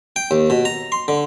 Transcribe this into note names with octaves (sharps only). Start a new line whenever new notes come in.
G5
D#2
B2
A#5
C6
D3